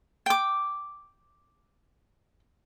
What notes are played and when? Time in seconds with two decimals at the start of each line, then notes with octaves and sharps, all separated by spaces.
0.26 G5 D6